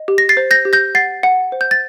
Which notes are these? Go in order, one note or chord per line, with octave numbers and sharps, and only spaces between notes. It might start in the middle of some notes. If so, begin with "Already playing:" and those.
Already playing: D#5
G4
A#6
A6 C7
C5
G6 A#6
G4
G6 A#6
F#5 A6 C7
F#5
C5
G6
A6